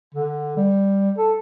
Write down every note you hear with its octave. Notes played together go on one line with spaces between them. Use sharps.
D3
G3
A4